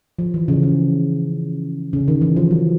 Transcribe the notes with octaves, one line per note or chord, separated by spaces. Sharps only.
F3
E3
C#3
C#3
C#3
D#3
E3
F3
F#3